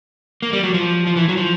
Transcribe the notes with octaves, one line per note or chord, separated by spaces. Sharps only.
A#3
G3
F#3
F3
F3
E3
F#3
F3